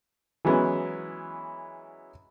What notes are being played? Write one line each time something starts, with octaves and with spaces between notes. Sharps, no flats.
E3 F#3 G#3 B3 C#4 E4